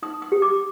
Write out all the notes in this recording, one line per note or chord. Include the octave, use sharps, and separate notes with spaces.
D#4 D#6
D#6
G4
D6